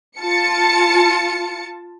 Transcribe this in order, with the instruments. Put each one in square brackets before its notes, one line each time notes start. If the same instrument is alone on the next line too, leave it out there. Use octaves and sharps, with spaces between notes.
[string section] F4 A5 C#7